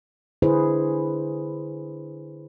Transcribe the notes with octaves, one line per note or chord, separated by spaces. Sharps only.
D3 E4 G#4 B4 C5